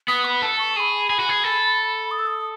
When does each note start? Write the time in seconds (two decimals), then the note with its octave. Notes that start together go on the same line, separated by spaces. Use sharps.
0.08 B3 D#6
0.25 B5
0.42 A4 A5
0.59 C#6
0.76 G#4 B5 C#6
1.10 G#4
1.20 F#4
1.29 G#4
1.44 A4
2.11 D#6
2.19 E6
2.27 D#6